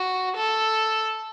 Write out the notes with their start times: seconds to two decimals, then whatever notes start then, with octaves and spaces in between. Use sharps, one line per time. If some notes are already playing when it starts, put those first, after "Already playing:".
Already playing: F#4
0.36 A4